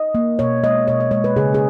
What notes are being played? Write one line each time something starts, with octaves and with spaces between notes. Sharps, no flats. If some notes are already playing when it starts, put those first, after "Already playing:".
Already playing: D#5
A#3
B2 C#5
G#3 D#5
B2 C#5
D#5
G#3 C#5
B4
C#3 G#4
G#4